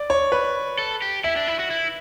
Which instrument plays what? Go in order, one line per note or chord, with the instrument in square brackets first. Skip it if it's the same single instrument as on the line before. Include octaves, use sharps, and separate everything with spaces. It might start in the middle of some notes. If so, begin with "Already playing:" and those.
Already playing: [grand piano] D5
C#5
B4
[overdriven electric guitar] A4
G4
[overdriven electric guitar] E4 [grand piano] E5
[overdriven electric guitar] D4
E4
F#4
E4